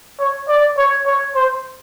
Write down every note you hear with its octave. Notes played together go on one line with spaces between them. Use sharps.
C#5
D5
C#5
C#5
C5